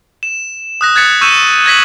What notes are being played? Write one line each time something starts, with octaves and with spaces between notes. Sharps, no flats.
E7
D#6 F#6 A#6
F#6 G#6 A6 B6 C#7 E7
C#6 E6 G6 C#7 D#7 E7
G#6 A#6 B6 F#7